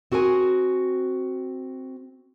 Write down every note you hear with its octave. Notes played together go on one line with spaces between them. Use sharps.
C4 F#4 G#4 A#4 G#5